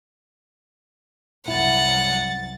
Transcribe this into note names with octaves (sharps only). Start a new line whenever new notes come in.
C2 F#2 E4 F#5 A6